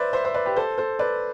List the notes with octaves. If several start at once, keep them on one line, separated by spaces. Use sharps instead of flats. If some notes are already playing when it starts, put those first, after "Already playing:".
Already playing: B4 C5 D5 E5
C5 E5
C5 E5
B4 D5
G4 B4
A4 C5
A4 C5
B4 D5